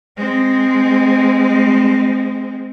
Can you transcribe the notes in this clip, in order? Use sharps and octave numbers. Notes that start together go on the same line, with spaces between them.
G#3 C4